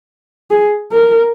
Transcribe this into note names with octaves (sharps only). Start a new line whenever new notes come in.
G#4
A#4